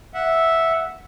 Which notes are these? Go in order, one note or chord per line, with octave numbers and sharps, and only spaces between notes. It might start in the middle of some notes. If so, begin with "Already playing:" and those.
E5 F#5